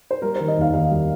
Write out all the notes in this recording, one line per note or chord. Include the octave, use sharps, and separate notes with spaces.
C5
G3 A#4
D#3 C5
D#5
D#2 F5
D#2 F5
G3